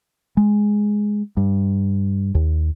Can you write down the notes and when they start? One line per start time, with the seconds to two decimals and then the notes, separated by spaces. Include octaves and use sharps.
0.37 G#3
1.37 G2
2.35 D#2